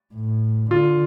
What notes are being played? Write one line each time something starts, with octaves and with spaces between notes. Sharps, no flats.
A2
D3 F4